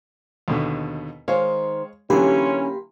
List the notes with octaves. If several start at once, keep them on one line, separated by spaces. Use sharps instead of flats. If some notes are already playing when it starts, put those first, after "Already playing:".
D#2 B2 D3
D#3 G#3 C5 C#5 F5
D3 E3 F#3 A#3 C#4 G4 B5 C6